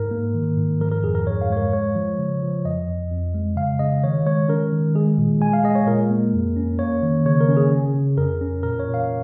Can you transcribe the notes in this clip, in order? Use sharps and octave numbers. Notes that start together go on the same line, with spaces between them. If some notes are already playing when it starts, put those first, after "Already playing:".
Already playing: G#2 A#4
A#3
D#3
G#2
F3 A#4
A#4
F2 G#4
A#4
G#2 C#5
F5
G#3 C#5
A#4
G#3 C#5
F3
C#3
F3
F2 D#5
F2
F2
G#3
C#3 F5
C#3 D#5
D#3 C#5
G#3 C#5
C#4 A#4
D#3
G#3 G#4
A#2
G#3 G#5
F5
G#3 D#5
C#5
A#2 A#4
A#3
F2
C#4
A#3 C#5
D#3
C#3 C#5
A#4
C#4
G#4
C#4
C#3
F2 A#4
C#4
A#2 A#4
C#5
A#2
F5